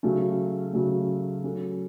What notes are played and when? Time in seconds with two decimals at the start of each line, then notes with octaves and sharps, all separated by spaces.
0.03 C#3 F#3 A3 C#4
0.73 C#3 F#3 A3 C#4
1.43 F#3 C#4 F#4 A4